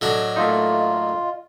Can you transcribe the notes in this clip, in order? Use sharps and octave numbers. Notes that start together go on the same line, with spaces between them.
A2 F#3 D4 D#5
A3 A#3 D#4 F4